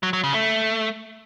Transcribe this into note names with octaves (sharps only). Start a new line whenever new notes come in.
F#3
F#3
C#3
A3